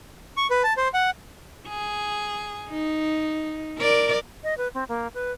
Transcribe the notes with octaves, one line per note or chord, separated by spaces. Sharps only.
C#6
B4
A5
C5
F#5
G#4
D#4
A#4 D5
D#5
B4
C4
A#3
B4